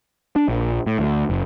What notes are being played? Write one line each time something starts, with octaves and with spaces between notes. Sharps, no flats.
D4
A#1
A2
D2
F#1